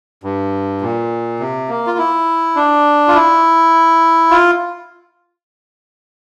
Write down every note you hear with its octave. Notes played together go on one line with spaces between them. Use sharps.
G2
A#2
C3
A#3
F4
E4
D4
F4
E4
F4